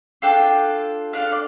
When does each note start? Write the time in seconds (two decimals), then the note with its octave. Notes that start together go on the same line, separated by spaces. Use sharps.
0.22 D4 F4 A4 G5
1.13 D4 A4 F5
1.32 D5